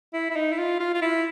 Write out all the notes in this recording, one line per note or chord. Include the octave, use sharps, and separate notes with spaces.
E4
E4
D#4
E4
F4
F4
F4
E4